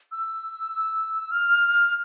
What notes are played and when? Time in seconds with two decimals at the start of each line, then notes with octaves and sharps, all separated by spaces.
0.12 E6
1.31 F6